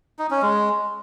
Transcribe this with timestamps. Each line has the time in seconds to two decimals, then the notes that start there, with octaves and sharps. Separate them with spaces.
0.19 D#4
0.31 C#4
0.42 G#3